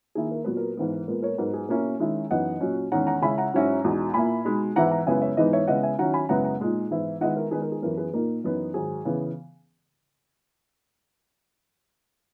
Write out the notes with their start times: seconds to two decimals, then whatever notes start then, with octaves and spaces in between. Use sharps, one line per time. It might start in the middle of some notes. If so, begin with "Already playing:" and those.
0.15 D#3 A#3 E4 G#4
0.31 A#4
0.44 A#2 F#3 B3 B4
0.57 A#4
0.77 G#2 E3 B3
1.08 A#2 G#3 B3 A#4
1.22 A#4 C#5
1.38 G#2 F#3 B3 D#4 A#4
1.54 G#4
1.69 B2 A#3 C#4 E4 A#4
2.00 D#3 G#3 C#4 E4
2.31 F#2 E3 B3 D#4 D#5 F#5
2.61 A#2 F#3 C#4
2.92 E2 D#3 G#3 C#4 F#5 A#5
3.07 F#5 A#5
3.22 C#3 G#3 C#4 E4 G#5 B5
3.38 F#5 A#5
3.54 G#2 F#3 C#4 E4
3.84 E2 B2 G#3 D#4
4.14 A#2 A#3 E4 G#5 B5
4.45 B2 G#3 D#4
4.76 G#2 E3 B3 E4 F#5 A#5
4.91 F#5 A#5
5.06 F#2 C#3 G#3 B3 E4 E5 G#5
5.22 C#5 E5
5.37 G#2 E3 G#3 B3 D#4 B4 D#5
5.53 C#5 E5
5.67 C#3 G#3 B3 E4 D#5 F#5
5.83 E5 G#5
5.98 D#3 F#3 C#4 E4 F#5 A#5
6.14 G#5 B5
6.29 F#2 C#3 G#3 B3 E4 F#5 A#5
6.44 F#5 A#5
6.60 A#2 G#3 D#4
6.91 G#2 E3 B3 E4
7.21 D#3 G#3 B3 E4 D#5 F#5
7.37 A#4
7.51 D#3 G#3 B3 D#4 G#4 B4
7.62 A#4
7.72 G#4
7.82 F#2 E3 B3 A#4
7.97 G#4 B4
8.13 A#2 A#3 D#4 A#4
8.44 F#2 E3 B3 D#4
8.74 G#2 D#3 F#3 G#4
9.05 C#3 E3 B3